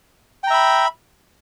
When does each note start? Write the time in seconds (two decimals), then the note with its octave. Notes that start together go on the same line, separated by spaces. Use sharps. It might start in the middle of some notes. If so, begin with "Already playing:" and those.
0.44 G5
0.47 A#5
0.51 E5
0.54 B5